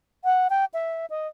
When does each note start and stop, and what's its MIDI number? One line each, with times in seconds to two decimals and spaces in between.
0.24 0.48 78
0.50 0.65 79
0.74 1.06 76
1.10 1.27 75